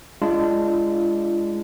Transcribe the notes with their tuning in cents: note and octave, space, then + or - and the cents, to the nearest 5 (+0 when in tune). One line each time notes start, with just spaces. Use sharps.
G#3 +0 D4 +0 F4 -30